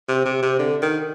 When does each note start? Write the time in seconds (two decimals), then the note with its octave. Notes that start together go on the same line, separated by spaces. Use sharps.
0.08 C3
0.26 C3
0.42 C3
0.59 D3
0.82 D#3